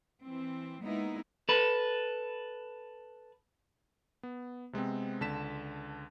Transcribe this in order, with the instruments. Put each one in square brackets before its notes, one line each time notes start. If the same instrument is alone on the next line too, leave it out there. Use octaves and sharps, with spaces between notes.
[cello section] E3 C4
G#3 A#3 B3 D#4 E4
[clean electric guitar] A4 B4
[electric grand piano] B3
C3 G#3 B3 C4
C#2 D3 A5 B6 E7